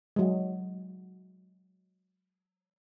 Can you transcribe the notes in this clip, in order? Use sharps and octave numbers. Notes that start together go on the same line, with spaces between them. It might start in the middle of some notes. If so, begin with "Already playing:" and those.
F#3 G#3